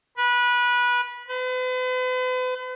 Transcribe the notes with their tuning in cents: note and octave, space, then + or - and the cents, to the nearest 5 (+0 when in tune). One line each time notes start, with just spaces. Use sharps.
B4 -20
B4 +45